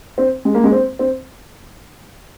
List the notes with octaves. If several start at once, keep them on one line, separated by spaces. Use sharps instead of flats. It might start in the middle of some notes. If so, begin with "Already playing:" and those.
C4
G#3
A#3
G#3
C4
C4